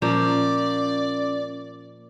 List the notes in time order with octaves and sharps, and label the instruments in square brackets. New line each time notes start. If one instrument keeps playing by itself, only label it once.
[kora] A#2 F3 A#3 [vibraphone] C#4 [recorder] D5